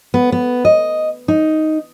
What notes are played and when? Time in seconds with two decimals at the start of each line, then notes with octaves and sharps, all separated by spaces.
0.14 B3
0.32 B3
0.65 D#5
1.28 D#4